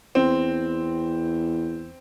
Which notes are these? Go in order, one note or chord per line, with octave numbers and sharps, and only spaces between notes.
E2 C4